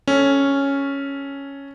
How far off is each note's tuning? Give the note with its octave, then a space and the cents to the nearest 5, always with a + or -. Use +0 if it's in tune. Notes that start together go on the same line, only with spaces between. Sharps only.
C#4 +0 A4 +0